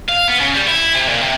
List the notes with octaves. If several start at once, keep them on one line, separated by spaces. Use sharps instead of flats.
F5
B3
C#3
G3
E4
C3
A#2
C3